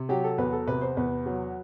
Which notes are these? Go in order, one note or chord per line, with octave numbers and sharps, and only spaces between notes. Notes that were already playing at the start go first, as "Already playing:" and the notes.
Already playing: C3
F#3 G4
A4
E2 B4
A4
C3 B4
C5
E2 B4
F#3